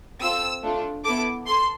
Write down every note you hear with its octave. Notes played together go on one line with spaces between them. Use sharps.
C4 F4 A4 E6
A3 D4 F4 A4
B3 E4 A4 D6
A4 C6